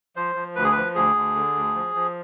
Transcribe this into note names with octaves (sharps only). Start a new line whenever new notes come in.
F3 C5
F3
D2 B4
G#4
F3 B4
D2 G#4
D2
D3
D2
F3
F3